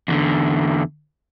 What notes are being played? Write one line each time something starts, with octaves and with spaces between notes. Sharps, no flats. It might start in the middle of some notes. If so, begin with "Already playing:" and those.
E2 D3